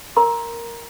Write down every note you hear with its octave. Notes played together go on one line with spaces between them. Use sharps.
A#4 A#5 C6